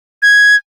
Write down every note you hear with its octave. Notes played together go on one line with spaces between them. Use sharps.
G#6